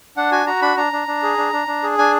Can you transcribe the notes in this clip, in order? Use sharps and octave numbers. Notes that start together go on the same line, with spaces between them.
D4 F#5
F#4 G#5
F#4 A#5
D4 B5
D4 A#5
D4
D4
G#4
D4
D4
D4
G#4
D4 G#5